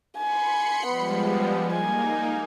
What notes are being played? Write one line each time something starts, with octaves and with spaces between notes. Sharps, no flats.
G#5 B5 C6 C#7
F3 G3 G#3 B3
A#3 D#4 G#5